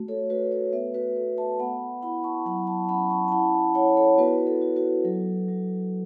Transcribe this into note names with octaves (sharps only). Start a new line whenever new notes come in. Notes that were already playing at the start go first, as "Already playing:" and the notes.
Already playing: A3 F#4
A4 C#5
A3 F#4 B4
A4 C#5
B3 B4 E5
F#4 B4
B3 A4
E5 A5
B3 F#5 B5
E4 F#5 B5
A5 C#6
F#3 F#5 B5
A5 C#6
C#4 F#5 B5
A5 C#6
A5
E4 F#5 B5
E4 C#5 F#5
A4 C#5
B3 F#4 B4
A4
F#4
F#4 B4
F#3 A4
F#3